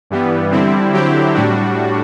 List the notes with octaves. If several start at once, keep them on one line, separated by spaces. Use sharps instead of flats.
G2 E3 G3 B3
D3 G3 C4 E4
D3 F#3 C4 E4 G4
A2 G3 D4 F#4